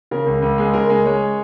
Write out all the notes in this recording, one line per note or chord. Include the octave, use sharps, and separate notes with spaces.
C#3 A#4
C#2
C#2
G#3
C#3 A#4
G#3
G#3 C#5